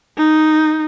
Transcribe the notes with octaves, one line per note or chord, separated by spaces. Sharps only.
D#4